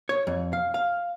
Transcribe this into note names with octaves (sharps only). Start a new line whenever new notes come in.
C#5
F2
F5
F5